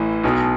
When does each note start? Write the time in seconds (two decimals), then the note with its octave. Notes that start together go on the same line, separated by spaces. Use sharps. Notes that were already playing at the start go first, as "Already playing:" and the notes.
Already playing: A1 A2 E3
0.24 B1 B2